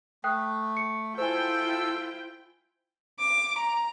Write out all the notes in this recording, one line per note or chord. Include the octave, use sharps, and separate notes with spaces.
A3 G5 D#6 F#6
C#7
E4 F4 A4 C5 G5 G#5 E6
D6
A#5